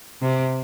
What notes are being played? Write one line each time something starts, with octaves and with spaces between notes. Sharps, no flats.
C3